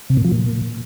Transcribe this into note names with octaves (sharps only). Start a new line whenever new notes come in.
C3
A#2
F3
A#2